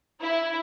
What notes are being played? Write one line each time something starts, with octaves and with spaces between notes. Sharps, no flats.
E4